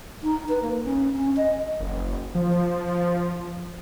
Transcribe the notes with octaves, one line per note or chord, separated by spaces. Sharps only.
D#4
B4
A#3
C#4
C#4
D#5
F#1
F3